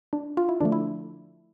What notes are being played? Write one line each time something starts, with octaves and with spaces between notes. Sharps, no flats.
D4
F4
E4
D3 F3 A3 D4
E4